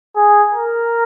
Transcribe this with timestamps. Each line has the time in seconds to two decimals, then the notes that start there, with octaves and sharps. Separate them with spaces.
0.16 G#4
0.54 A#4